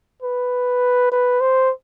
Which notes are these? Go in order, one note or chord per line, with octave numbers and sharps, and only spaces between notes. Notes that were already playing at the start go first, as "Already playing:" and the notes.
B4
B4
C5